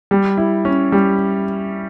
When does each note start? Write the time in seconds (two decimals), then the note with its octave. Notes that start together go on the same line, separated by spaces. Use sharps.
0.11 G3
0.37 E4
0.65 C#4
0.92 G3